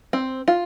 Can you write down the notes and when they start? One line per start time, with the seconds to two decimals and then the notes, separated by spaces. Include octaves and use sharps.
0.13 C4
0.48 F4